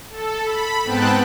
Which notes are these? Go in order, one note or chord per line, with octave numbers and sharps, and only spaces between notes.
A4
B5
G#2 B3 C4 G5 A5 F#6